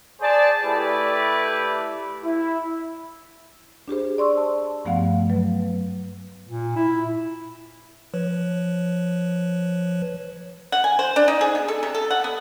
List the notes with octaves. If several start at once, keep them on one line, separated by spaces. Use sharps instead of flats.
G#4 C5 D5 A5
A3 E4 G4 B4 D5
E4
D4 G4 G#4 C5
D5 C6 C#6 E6
A5
G2 F3 A3 B3 F5 F#5
F#3 B4
A#2
E4
F3 B4 C#5
F#5
G#5
C5
D4
D#4
G#4
B3
A4
C3
A4
F#5
B3